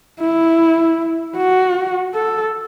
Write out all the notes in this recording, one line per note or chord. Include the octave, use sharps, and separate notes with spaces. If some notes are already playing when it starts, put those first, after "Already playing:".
E4
F#4
A4